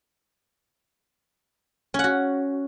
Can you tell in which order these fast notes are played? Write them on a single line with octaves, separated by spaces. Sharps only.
C#4 F#5 F#4